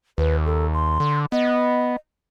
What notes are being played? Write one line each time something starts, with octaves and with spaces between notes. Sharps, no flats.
D#2 B4
A4
C6
D3
B3 D#5